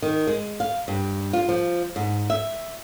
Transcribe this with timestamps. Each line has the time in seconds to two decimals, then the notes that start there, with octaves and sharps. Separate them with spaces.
0.02 D#3
0.27 G#3
0.60 F5
0.88 G2
1.33 F4
1.49 F3
1.96 G#2
2.30 E5